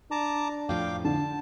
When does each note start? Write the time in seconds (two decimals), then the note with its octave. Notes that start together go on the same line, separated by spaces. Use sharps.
0.11 D4 A5 A#5 D6
0.69 F2 A2 F3 F5 G5 D6
1.05 D3 A5